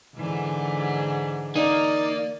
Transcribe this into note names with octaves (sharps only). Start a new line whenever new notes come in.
G#2 D3 E3
A#3 D#4 D5